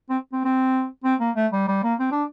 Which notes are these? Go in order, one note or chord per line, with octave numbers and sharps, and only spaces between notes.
C4
C4
C4
C4
A#3
A3
G3
G3
A#3
C4
D4